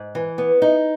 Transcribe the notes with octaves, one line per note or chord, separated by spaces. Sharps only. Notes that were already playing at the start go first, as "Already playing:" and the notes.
Already playing: G#2
E3
B3
D#4